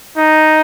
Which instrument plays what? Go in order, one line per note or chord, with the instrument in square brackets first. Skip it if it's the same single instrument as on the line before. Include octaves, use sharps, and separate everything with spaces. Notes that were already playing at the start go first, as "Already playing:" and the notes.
[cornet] D#4